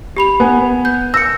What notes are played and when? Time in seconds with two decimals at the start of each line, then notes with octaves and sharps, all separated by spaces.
0.17 G4 B5 F7
0.40 B3 G#5
0.85 G6
1.14 E6 A#6 C#7